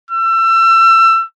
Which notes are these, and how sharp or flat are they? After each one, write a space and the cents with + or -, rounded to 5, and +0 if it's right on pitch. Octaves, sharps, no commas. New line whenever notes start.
E6 +30